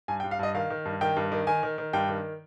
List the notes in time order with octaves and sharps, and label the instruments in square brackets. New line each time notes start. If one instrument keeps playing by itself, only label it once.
[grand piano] G2 G#5
G5
G2
F5
G2 D#5
D#3 F5
D#3
G2
D#3 G5
G2
D#3
D#3 G#5
D#3
D#3
G2 G5
D#3